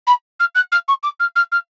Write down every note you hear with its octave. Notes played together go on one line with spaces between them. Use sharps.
B5
F6
F#6
F6
C#6
D6
F6
F6
F6